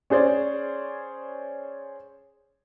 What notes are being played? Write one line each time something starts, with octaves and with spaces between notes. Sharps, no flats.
C#4 G#4 C5 D5